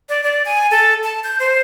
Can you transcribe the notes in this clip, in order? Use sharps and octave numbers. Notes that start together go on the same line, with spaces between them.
D5
D5
G#5
A4
A5
G6
C5